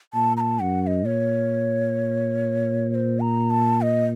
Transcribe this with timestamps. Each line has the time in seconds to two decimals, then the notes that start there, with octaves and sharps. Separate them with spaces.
0.14 A#2 A5
0.37 A#5
0.40 A5
0.60 F#2 F#5
0.82 F#5
0.87 D#5
1.05 A#2 C#5
2.90 C#5
2.95 C5
3.20 A#5
3.50 A5
3.82 D#5